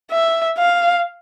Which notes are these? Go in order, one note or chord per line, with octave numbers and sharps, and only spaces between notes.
E5
F5